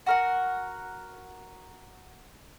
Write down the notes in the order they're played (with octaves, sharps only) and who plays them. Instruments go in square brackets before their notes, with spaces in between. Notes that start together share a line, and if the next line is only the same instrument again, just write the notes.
[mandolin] F#4 A#4 F#5